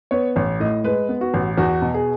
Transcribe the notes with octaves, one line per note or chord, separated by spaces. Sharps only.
B3 C#5
A1 C#5
A2 D#5
G#3 B4
B3
F#4
A1
E2 F#4
B2
G#4